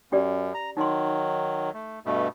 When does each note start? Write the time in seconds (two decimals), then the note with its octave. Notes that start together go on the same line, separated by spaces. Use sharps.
0.12 F#2 C#4 G4 D5
0.54 A#5
0.77 D#3 F#3 D#4 C6
1.74 A3
2.06 G2 B2 A3